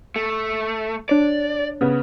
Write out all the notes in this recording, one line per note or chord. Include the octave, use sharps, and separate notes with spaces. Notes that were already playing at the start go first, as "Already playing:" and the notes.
A3
D4 C#5 D5
C#3 B3